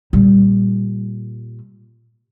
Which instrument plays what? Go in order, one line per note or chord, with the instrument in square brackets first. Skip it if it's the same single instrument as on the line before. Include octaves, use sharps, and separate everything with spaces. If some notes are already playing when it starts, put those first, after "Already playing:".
[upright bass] A#2 G3